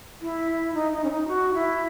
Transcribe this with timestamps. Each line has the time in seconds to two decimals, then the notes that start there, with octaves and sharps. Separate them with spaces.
0.21 E4
0.74 D#4
0.92 D#4
1.04 C#4
1.10 D#4
1.28 F#4
1.54 E4